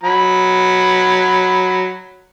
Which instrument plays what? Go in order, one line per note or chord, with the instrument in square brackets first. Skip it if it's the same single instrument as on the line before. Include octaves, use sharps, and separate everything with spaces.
[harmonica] F#3 B5